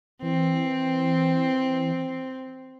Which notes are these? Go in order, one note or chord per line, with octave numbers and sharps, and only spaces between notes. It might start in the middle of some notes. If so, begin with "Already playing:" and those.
E3 C4